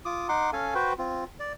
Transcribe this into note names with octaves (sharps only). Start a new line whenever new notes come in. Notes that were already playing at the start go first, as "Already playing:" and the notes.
F4 D6 D#6
D#4 F#5 C6 D6
C#4 A4 F5 G#5
F#4 B4 C5 G5
C4 F4
D5